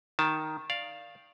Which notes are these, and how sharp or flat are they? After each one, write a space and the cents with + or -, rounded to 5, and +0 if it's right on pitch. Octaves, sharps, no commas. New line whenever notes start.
D#3 +0 A5 +0
D5 +0 F5 +0